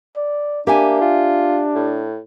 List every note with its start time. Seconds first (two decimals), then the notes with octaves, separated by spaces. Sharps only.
0.16 D5
0.67 A#3 D4 G4 E5 G#5
1.02 F4
1.75 A2